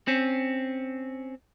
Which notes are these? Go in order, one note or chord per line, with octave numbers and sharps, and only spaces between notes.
C4 C#4